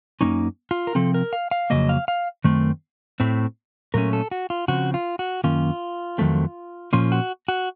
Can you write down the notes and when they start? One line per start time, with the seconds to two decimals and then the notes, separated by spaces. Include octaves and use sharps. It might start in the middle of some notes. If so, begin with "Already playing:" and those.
0.21 F#2 D#3 A#3 C#4 D#4
0.71 F4
0.87 A#4
0.95 C3 F3 C4 A4
1.14 A#4
1.33 F5
1.51 F5
1.70 F2 C#3 F#3 A#3 D#5
1.89 F5
2.08 F5
2.44 F#2 D#3 A3 C4
3.20 A2 A3 C4
3.94 A#2 F#3 A3 C#4 A#4
4.13 A4
4.31 F#4
4.50 F4
4.68 C#3 F3 C4 F#4
4.94 F4
5.19 F#4
5.44 F#2 D#3 A#3 C#4 F4
6.18 F2 D#3 F#3 A3 C4
6.93 A#2 F3 A#3 C#4 F4
7.12 F#4
7.48 F#4